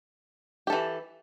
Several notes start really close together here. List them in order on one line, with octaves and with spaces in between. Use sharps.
G4 A4 E3